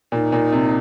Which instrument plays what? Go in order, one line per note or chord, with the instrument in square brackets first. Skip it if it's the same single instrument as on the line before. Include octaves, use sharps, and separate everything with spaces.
[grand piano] A#2 [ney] D#4
[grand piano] A#2
C3